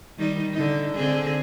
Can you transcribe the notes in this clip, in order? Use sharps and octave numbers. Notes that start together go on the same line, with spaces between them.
D#3 G3 D#4
D3 D#4
D3 C4 G#4